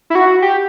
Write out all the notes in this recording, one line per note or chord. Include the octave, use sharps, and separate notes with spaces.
E4
F#4
G4